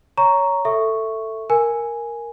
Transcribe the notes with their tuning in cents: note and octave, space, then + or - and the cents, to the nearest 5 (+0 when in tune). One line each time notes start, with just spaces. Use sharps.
C#5 +10 A#5 +0 C#6 +10
A4 +15 E5 +0 C#6 +0
A#4 +0 G#5 +0